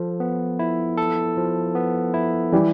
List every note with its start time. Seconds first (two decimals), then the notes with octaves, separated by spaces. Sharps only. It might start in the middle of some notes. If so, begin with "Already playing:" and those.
Already playing: F3 A4
0.20 B3
0.59 E4
0.98 A4
1.37 F3
1.75 B3
2.14 E4
2.52 E3 G3 G4